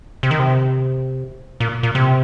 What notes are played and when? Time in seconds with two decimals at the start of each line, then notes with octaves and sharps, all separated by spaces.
0.23 C3
0.31 D#3
0.40 C3
1.60 A#2
1.83 A#2
1.95 C3